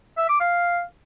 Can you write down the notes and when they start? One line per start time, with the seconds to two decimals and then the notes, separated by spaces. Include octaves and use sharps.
0.18 E5
0.29 D6
0.40 F5